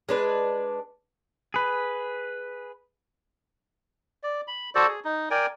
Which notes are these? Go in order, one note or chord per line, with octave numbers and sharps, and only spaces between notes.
G#3 D4 B4
G#4 B4
D5
B5
F#4 A4 C5 D5
G#4
D#4
A#4 D5 G5 G#5